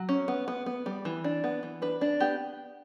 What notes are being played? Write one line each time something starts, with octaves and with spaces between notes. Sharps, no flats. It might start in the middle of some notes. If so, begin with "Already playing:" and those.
Already playing: F#3
C#4
B3
B3
B3
G3
E3
D4
B3
E3
D4 B4
D4
B3 G4